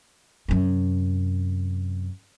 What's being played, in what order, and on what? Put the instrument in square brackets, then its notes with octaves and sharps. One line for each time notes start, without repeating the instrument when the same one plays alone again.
[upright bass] F#2 C3